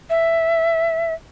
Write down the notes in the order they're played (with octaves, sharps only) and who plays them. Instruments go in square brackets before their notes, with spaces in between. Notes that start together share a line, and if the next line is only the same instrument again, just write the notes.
[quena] E5